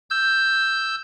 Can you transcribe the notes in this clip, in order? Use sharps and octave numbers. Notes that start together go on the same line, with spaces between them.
E6 G6